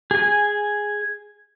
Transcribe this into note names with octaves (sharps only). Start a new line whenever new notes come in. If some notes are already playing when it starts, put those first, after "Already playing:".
G#4 G#5